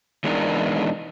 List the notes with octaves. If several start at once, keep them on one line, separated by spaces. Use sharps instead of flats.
E3 G#3 B3 D4 D#4 A#4